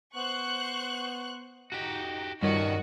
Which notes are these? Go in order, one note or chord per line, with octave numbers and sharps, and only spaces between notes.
B3 C5 C#6 F#6
D#4 F#4 G4
G2 D#3 G3 C#4 F#4